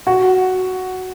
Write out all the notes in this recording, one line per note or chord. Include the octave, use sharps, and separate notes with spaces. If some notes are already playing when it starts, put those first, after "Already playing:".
F#4